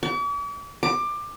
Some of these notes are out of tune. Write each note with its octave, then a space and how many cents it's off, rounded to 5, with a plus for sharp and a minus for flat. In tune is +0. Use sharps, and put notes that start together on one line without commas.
D6 -45
D6 +20